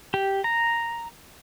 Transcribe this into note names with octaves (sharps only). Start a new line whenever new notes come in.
G4
A#5